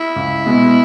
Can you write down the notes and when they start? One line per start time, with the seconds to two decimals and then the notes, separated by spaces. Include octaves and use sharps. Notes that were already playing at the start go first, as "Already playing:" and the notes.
Already playing: E4
0.16 C#2
0.46 B2 G#3 B3